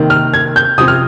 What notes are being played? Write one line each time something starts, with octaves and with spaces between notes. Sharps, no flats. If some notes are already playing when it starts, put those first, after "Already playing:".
Already playing: C3 D#3 A#3
F6
G#6
G6
C3 F3 C4 D#6
F6